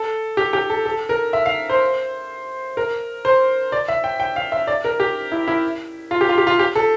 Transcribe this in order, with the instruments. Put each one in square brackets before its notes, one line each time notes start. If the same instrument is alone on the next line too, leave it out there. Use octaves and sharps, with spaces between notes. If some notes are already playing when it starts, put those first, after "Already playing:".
Already playing: [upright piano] A4
G4
G4
A4
A4
A#4
E5
F5
C5
A#4
C5
D5
E5
G5
G5
F5
E5
D5
A#4
G4
E4
E4
F4
G4
F4
G4
F4
G4
A4